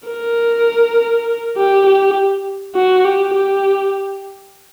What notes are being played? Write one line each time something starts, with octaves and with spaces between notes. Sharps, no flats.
A#4
G4
G4
F#4
G4
G4